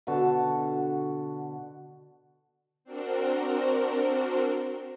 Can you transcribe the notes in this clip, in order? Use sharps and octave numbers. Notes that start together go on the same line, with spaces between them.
B2 D3 F#4 A5
C4 D4 F#4 A#4 C5